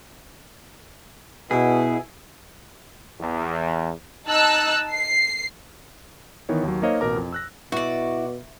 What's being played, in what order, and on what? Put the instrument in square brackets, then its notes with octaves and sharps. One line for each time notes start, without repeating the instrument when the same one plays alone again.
[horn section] B2 [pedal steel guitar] E4 G#4
[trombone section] E2
[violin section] D#4 A5 E6 F#6
C7
[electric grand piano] D#3 E3 B3 C#5
D#2 F#3
A#3 D#4 C5 C#5 D#5 F5
A1 B2 A#4 A#5 D6
F2
E6 F#6 A#6
[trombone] B2 [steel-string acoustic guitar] E4 [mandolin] F#4 D5